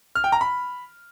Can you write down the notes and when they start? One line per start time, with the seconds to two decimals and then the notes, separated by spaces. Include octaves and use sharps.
0.15 F6
0.24 G5
0.32 A#5
0.41 B5